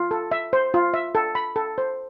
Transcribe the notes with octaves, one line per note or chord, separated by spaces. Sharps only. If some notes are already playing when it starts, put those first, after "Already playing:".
Already playing: F4
A4
E5
C5
F4
E5
A4
B5
A4
C5